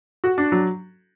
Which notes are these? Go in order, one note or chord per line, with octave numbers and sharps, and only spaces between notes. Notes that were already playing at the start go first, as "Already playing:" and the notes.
F#4
D4
F#3